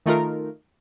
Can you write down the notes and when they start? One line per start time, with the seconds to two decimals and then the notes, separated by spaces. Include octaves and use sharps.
0.06 D#3 A3 D#4 F4 A#4